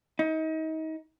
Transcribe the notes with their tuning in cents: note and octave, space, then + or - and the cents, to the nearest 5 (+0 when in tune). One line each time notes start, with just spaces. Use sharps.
D#4 +30